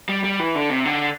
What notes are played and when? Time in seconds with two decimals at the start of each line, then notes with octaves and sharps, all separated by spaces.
0.09 G3
0.24 G3
0.39 E3
0.55 D3
0.70 C3
0.85 D3